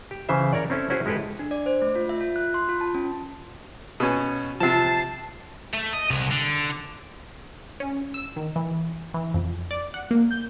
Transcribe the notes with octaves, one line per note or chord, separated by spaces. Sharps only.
G4
C#3 E3 C5 E5
A#4 C#5 D5
C4 C#4 E4 A4
C#4 E4 F#4 G#4 C5
G#3 E4 G4 A4 B4
D4
D5
C5
A3
F4
E5
F4
F#6
C6
F4
A5
C#4
B2 C#4
C3 F3 A5 A6 C7
A3
D#5
C2
D3
C#4
E6
D#3
E3
E3
F2
D5
F#5
A#3
G6